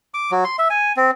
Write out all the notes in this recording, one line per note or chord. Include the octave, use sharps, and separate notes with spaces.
D6
F#3
C6
E5
G#5
C4